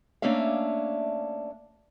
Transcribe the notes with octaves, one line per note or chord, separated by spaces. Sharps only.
A3 A#3 C#4 D4 E5 F5